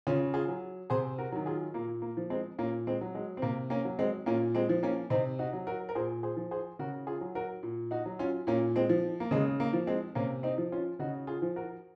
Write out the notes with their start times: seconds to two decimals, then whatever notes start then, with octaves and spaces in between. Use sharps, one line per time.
0.07 C#3 C#4 F4
0.34 F4 G#4
0.48 F#3
0.90 C3 G#4 C5
1.18 F#4 A#4
1.32 D#3 F#3
1.46 F4 G#4
1.74 A#2 A#3
2.02 A#3
2.17 F3
2.30 G#3 C4
2.58 A#2 A#3 C#4
2.87 G#3 C4
3.01 F#3
3.15 G#3
3.37 C4
3.42 C3 A#3
3.70 A#3 C#4
3.85 F#3
3.99 G#3 C4
4.26 A#2 A#3 C#4
4.55 G#3 C4
4.69 F3
4.83 A#3 C#4
5.10 C3 C4 D#4
5.39 D#4 F#4
5.53 F#3
5.67 F#4 A#4
5.89 A#4
5.95 A#2 G#4 C5
6.23 G#4 C5
6.37 F3
6.51 G#4 C5
6.79 C#3 F#4 A#4
7.07 F4 G#4
7.21 F#3
7.35 F#4 A#4
7.63 A#2
7.91 D#4 F#4
8.06 F#3
8.19 C#4 F4
8.47 A#2 A#3 C#4
8.76 G#3 C4
8.89 F3
9.20 A#3
9.31 C#3 G#3
9.60 A#3
9.73 F3
9.87 G#3 C4
10.15 C3 A#3 C#4
10.43 C4 D#4
10.58 F3
10.72 C#4 F4
10.99 C#3 D#4 F#4
11.27 F4 G#4
11.42 F3
11.56 F#4 A#4